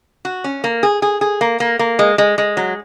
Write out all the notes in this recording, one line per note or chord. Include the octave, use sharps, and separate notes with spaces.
F#4
C#4
A#3
G#4
G#4
G#4
A#3
A#3
A#3
G#3
G#3
G#3
F#3